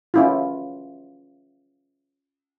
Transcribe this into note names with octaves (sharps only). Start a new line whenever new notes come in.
C#4 E4 F4